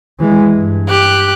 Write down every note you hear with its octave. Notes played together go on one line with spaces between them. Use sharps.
E3 G#3
G2
G4 F#6